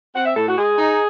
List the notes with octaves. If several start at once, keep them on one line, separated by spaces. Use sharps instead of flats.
C4 F#5
E5
A2 A4
F#4
G#3 G#4
D#4